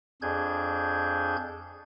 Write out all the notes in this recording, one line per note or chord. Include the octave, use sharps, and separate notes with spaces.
F2 D4 G#4 G6 G#6